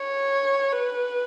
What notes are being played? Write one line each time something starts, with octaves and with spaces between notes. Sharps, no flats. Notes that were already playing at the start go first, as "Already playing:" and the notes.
Already playing: C#5
B4